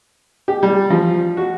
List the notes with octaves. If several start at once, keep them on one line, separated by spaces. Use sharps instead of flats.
G4
G3
F3
F#4